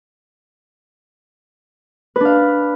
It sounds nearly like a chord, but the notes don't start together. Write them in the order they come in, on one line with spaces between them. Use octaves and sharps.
B4 D4 F5